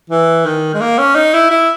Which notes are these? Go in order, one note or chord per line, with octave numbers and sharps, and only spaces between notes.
E3
D#3
G#3
A#3
C#4
D#4
E4
E4